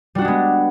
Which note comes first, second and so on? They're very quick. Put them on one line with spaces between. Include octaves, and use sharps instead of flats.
G3 F#4 D4 G#3 B3